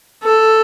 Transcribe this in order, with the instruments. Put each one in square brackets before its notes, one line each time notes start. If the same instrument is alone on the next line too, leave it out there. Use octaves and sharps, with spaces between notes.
[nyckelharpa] A4